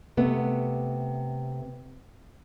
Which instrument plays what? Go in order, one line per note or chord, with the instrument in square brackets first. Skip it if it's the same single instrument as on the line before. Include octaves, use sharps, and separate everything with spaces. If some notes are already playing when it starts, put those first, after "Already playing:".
[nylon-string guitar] C3 A3 B3